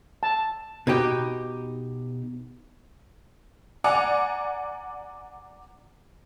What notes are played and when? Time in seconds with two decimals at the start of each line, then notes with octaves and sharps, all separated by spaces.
0.23 A5
0.87 B2 D#4 G4
3.84 D5 F#5 G#5 A#5 D6